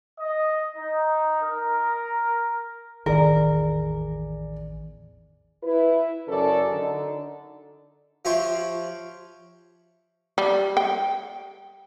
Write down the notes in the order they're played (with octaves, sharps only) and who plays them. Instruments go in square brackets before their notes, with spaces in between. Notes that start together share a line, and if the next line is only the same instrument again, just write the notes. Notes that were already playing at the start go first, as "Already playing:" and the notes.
[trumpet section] D#5
D#4
A#4
[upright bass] A1 E2 [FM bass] D#3 [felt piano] G#4 D5 [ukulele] A#4
[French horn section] E4 B4
F#2 C#3 A4 A#4 D5
D3 D#4
[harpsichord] F3 F4 G4 C5 C#5 E5
[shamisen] G3
G5